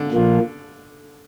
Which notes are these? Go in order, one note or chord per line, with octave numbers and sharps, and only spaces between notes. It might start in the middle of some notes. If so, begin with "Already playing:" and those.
Already playing: D3
A#2 F3 A#3 F4